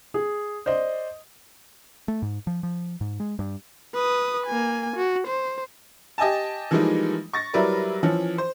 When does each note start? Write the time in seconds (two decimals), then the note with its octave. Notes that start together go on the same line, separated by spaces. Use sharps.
0.14 G#4
0.66 C5 D5 D#5
2.08 A3
2.22 G#2
2.47 F3
2.63 F3
3.01 G#2
3.20 G#3
3.39 G2
3.94 B4 D#6
4.46 A#3 G#5
4.97 F#4
5.27 C5
6.18 G4 D#5 G#5 A5
6.71 E3 F3 G3 G#3 A#3 D#4
7.33 C#6 A6 A#6
7.54 F#3 G3 E4 A#4 B4 D5
8.03 E3 F3 C#4
8.38 C5